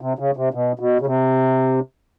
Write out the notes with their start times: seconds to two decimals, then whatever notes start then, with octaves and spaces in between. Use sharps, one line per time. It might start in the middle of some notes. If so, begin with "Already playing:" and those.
0.01 C3
0.19 C#3
0.37 C3
0.54 B2
0.79 B2
1.01 C#3
1.07 C3